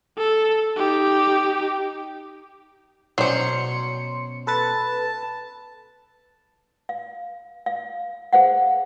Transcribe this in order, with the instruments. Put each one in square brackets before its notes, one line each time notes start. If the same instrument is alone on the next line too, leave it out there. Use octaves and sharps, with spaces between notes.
[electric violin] A4
D#4 G4
[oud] B2 C#4 D5 [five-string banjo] F#3 C5 [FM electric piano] C6 C#7
[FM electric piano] A4 B4 A6 [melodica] A5
[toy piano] F5
F5
G#4 C5 F5 F#5